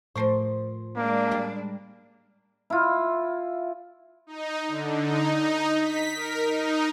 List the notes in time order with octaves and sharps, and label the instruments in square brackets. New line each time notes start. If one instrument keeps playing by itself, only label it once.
[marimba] A2 A3 C#6 [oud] F3 A#4 C5
[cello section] G#3 D4 [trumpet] A#3
[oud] G3
[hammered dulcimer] E4 F4
[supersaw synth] D#4
D3
D#4
D#4
B6
A#4
D#4